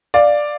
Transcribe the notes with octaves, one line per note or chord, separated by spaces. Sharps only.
D5 F5